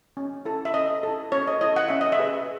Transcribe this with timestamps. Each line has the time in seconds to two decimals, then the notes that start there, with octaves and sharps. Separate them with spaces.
0.17 C#4
0.45 E4 A4
0.65 E5
0.74 C#4 D#5
1.03 E4 A4
1.32 C#4 C#5
1.47 D#5
1.61 E4 A4 D#5
1.76 F#5
1.88 C#4 E5
2.01 D#5
2.12 E5
2.19 G#4 B4